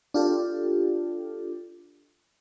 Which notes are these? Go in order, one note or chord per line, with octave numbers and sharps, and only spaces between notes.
D4 F4 G4 A4